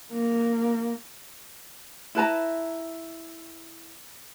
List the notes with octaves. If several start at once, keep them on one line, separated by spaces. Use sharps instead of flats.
A#3
E4 B4 A5 A#5